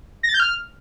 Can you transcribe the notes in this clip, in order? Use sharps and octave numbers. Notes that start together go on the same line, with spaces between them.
A#6
A6
G6
F6